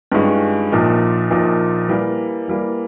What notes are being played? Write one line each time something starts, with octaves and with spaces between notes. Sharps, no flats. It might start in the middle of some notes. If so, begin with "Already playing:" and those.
G2 D#3 G#3 C#4 F4
A#1 A#2 F3 A#3 D#4
A#1 A#2 F3 A#3 D#4
E3 G3 A#3
E3 G3 A#3